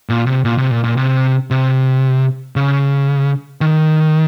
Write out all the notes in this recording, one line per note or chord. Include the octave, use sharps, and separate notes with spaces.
A#2
C3
A#2
C3
A#2
A#2
C3
C3
C#3
D#3